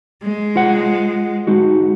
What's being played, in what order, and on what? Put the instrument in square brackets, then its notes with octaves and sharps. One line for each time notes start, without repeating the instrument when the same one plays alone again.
[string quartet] G#3
[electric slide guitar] F4 C5 F#5
G#3 D#4 F#4